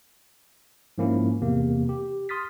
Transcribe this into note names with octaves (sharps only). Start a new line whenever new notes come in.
G#2 F3 A#3 C#4 E4
E2 C3 A#3
G4
C6 D#6 F6 A6 B6